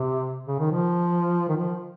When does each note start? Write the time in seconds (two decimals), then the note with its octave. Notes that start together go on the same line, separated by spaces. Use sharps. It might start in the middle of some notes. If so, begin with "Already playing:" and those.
Already playing: C3
0.47 C#3
0.59 D#3
0.71 F3
1.49 D#3
1.56 F3